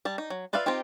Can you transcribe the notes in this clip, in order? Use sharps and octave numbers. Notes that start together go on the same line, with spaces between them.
G3 A5
D#4
F#3
F4 B4 D5 E5 F5
C4 D#4 F4 G4